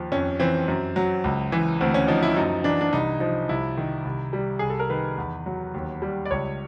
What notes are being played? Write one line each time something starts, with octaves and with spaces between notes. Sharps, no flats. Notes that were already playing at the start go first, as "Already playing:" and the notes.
Already playing: D#2 F3
F2 C#4
E3 C4
F#2
F#3
C#2
E3
D2 C4
C#4
F3 D#4
E4
F#2 D#4
E3 D4
D4
C2 D#4
F3 D#4
C2 E4
D#3
C2
G3
C2 G#4
A4
A#4
D#3 B4
E2
F#3
D#2
G3
D5
C#2 C#5